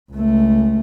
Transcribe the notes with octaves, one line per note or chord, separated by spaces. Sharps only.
C#2 A3